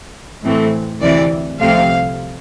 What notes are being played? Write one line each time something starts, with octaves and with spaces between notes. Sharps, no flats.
A2 E3 A3 C4
D2 C3 E3 D5
C2 C3 F3 A3 C4 F5